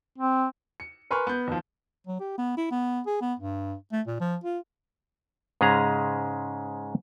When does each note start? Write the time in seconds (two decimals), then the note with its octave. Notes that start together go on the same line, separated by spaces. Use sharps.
0.18 C4
0.80 C#7
1.10 A#4 B4 G#5 C6 C#6 F6
1.27 B3 G6
1.48 D#2 F3
2.07 F#3
2.20 G4
2.38 B3
2.57 E4
2.71 B3
3.06 G#4
3.21 B3
3.39 G2
3.93 A3
4.07 A#2
4.20 F3
4.44 F4
5.61 G#2 C#3 G#3 C#4 G#4 A#5